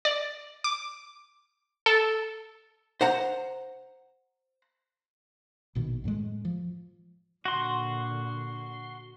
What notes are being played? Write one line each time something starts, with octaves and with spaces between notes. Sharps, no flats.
D5
D6
A4
C5 F#5 A#5
A#1 B2 D#3
F#2 A2 G3 G#3
F3
A#2 D3 F#4 C6